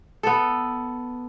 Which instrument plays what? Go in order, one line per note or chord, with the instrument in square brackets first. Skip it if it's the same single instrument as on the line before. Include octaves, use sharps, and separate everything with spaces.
[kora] B3 A4